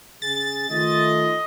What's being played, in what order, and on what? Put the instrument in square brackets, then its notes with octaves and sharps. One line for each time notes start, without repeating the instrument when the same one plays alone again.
[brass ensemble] C#3 G#4 [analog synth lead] A6
[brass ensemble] D#3 A3 [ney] F4 [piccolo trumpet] D#5